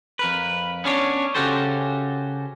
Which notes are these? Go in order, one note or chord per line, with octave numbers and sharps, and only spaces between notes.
F2 A#4 B4
B3 C#4 D4 C#5
C#3 C#4 F#4 G4 A4 C5